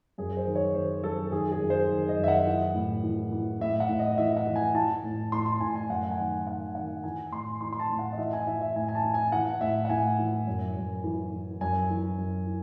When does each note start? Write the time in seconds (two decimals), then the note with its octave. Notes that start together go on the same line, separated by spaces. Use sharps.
0.18 F#2 G#4
0.37 C5
0.46 D#3
0.55 C#5
0.75 D#3 C5
1.04 F#2 A4
1.32 D#3 G#4
1.52 G#4
1.60 F#2
1.70 C5
1.89 D#3
2.09 D#5
2.18 F#2
2.24 E5
2.28 F#5
2.47 E3
2.74 A2
3.03 E3
3.32 E3
3.60 A2 E5
3.80 F#5
3.89 A2
3.99 D#5
4.12 D#5
4.18 E3 E5
4.37 F#5
4.47 E3
4.55 G#5
4.75 E3 A5
5.04 A2
5.32 A2 C6
5.46 C6
5.60 A2 G#5
5.75 G#5
5.89 F#2 F#5
6.11 G#5
6.18 D#3 F#5
6.47 D#3 F#5
6.75 D#3 F#5
7.04 E3 G#5
7.32 A2 C6
7.61 E3 C6
7.73 C6
7.79 A5
7.90 A2
7.99 F#5
8.12 D#5
8.18 E3 E5
8.33 G#5
8.47 E3 E5
8.61 E5
8.76 A2 G#5
8.88 G#5
8.95 A5
9.03 E3
9.14 G#5
9.32 E3 F#5
9.61 A2 E5
9.85 F#5
9.89 A2 G#5
10.19 E3
10.47 F#2
10.76 F#2
11.04 E3
11.33 E3
11.61 F#2 G#5
11.90 E3
12.18 F#2
12.47 E3